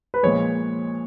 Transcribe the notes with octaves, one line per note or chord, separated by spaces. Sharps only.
B4
A#2 F3 G#3 C#5